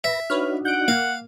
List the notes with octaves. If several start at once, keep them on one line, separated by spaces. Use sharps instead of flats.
B4 E5 A#6
D4 D#4 F#4 B4 C#5 F6
F#5 G6 D7
A#3 F5